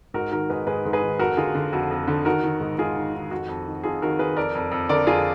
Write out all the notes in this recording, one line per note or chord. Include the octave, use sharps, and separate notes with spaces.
G#2 F#4 A#4
D#3 F#4 A#4
G#2 G#4 B4
G#2 G#4 B4
G#2
G#4 B4
D#3
F2 F#4 A#4
D3 F4 G#4
D3
F2 F#4
F2
D3
D#3 F#4 A#4
D#3
G#2
G#2 F4 G#4
D#3
D#3
F2 F#4
F2
D#3
F2 F4 G#4
D#3 F#4 A#4
D#3 G#4 B4
F2 A#4 D5
F2
F2
D3 A#4 D5
F2 F4 G#4